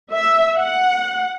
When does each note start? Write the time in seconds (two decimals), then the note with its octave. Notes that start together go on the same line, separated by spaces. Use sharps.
0.11 E5
0.57 F#5